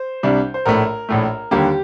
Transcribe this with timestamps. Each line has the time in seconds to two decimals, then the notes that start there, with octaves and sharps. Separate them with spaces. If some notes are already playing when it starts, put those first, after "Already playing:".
Already playing: C5
0.23 C2 C3 G3 D4
0.54 C5
0.65 A#1 A2 A3 A#4
1.09 A#1 A2 A3
1.51 D#2 D3 G3 A#3 G4